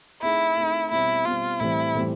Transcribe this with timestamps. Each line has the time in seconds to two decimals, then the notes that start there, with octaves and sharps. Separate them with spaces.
0.22 A3 C4 D#4 E4 G#4
0.57 A3 C4 D#4 G#4
0.91 B2 G3 C4 E4
1.25 B2 G3 C4 F4
1.60 A2 E3 G3 C4 E4
1.95 A2 E3 G3 C4